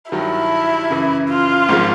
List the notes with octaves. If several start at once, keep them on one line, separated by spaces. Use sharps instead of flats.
G2 D#3 F#3 E4
F#2 C#3 E3
F4
G#1 G#2 F3 G#3